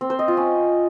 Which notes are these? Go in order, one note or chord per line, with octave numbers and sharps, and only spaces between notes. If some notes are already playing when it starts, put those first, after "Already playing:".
C4
C5
D#5
F4
C#4